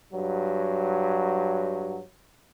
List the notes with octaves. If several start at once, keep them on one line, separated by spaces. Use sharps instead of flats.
G2 F#3